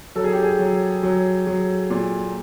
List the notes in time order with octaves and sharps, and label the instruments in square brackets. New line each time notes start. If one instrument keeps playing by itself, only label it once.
[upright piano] F#3 [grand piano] A4
[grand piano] G#4
G4
G#4
[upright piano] F#3
F#3
F#3
A#2